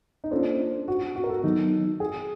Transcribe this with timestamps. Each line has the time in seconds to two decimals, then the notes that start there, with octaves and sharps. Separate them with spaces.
0.24 D#4
0.31 A#3 C#4 D4 F4 A4 C5
0.88 F#4
1.01 F#4
1.16 F#4
1.24 A#4
1.29 A4
1.44 D#3 F#3 B3 D#4
2.00 G#4